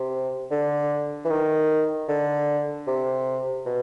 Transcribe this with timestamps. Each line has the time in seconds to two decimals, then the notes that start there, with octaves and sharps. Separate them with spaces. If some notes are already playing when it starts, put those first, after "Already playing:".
Already playing: C3
0.51 D3
1.25 E3
1.30 D#3
2.08 D3
2.87 C3
3.66 B2